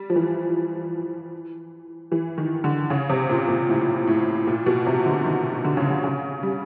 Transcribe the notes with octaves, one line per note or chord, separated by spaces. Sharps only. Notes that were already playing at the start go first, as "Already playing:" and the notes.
Already playing: G3
F3
E3
E3
D#3
D3
C#3
C3
A#2
A#2
A2
A2
A#2
B2
C3
D3
D#3
D3
C#3
D3
C#3
G3